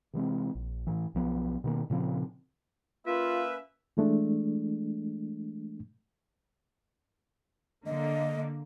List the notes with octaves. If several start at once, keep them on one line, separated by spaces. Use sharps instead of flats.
C3 E3 G#3 C4
A#1
A2 E3
B1 F3 B3
B2 D#3 A#3
A#2 C#3 F3 C4
A#3 C#4 F4 B4 E5
E3 G#3 A3 D4
D3 A#3 D#5